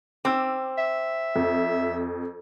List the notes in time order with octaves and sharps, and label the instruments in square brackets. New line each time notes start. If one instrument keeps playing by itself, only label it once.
[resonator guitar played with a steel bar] C4 [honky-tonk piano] D6 E6
[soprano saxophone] E5
[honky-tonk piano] F2